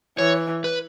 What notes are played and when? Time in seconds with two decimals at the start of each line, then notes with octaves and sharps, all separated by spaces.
0.18 E3 C#5
0.64 B4